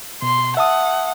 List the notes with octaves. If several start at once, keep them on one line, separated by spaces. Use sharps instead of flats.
B2 C6
E5 F#5 A5 D#6